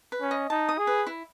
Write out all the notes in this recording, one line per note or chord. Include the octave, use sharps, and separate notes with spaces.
B4
C#4
D#5
D#4 A5
D#6
G#4
B4
E4